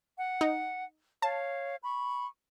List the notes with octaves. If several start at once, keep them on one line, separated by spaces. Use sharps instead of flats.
F#5
D#4
C#5 F5 A5
B5 C#6